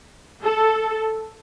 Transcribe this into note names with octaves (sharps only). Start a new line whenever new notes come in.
A4